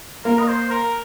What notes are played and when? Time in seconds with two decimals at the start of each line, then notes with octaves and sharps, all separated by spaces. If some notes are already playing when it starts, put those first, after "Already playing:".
0.25 A#3 A#4
0.39 D#5
0.48 C5
0.70 A#4